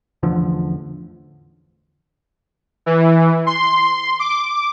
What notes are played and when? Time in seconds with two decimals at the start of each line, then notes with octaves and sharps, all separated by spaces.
0.23 A1 E2 D3 F3
2.86 E3
3.47 C6
4.19 D6